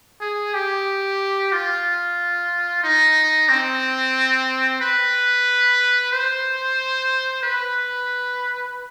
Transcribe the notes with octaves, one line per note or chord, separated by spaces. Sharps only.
G#4
G4
F4
D#4
C4
B4
C5
B4